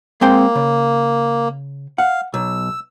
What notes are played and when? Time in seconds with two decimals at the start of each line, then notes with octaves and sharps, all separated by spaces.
0.21 G#3 A#3 C4 G5
0.55 C#3
1.98 F5 F#5
2.34 B1 E6